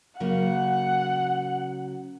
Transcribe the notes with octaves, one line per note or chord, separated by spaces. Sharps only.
C#3 F#3 A#3 F#5